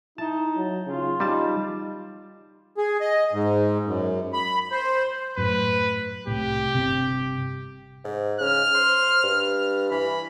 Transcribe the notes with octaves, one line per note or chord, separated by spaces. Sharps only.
D#4 E4 A5
F#3
C#3 F4
G3 D#4 A5
G#4
D#5
G#2
F#2
B5
C5
F#2 A2 B4
C2 A2 G4
G1 C3
G#2
C#3 F6
C5
G2
E3 B5